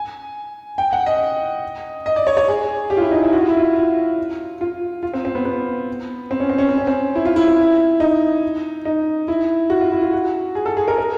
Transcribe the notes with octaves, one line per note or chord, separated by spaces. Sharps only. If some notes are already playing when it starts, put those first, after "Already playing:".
Already playing: G#5
G5
F#5
D#5
D#5
D5
C#5
C#5
G#4
G4
F4
E4
D#4
E4
F#4
F4
E4
F4
F4
F4
F4
C4
C4
B3
B3
C4
C#4
C4
C#4
C4
C#4
C4
E4
F4
E4
E4
D#4
D#4
E4
F#4
F4
E4
F4
F#4
G#4
A4
G#4
A#4
A#4